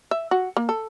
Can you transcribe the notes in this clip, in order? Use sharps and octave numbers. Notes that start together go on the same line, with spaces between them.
E5
F#4
A#3
A4